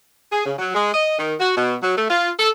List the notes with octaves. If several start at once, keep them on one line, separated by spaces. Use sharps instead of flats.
G#4
C#3
F#3
G#3
D#5
D#3
F#4
B2
F#3
A3
F4
A4